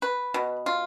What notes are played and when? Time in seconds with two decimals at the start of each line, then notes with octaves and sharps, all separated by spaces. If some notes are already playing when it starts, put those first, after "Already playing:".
0.02 B4
0.34 B2
0.66 F4